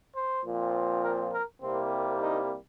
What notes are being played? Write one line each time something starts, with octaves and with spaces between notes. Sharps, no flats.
C5
A#2 F3 C4
A#4
A#4
C2 C3 G3 A#3 C4
D#4